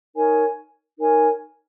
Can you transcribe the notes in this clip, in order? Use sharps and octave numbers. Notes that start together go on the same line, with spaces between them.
D#4 A#4 C#5 G#5
D#4 A#4 C#5 G#5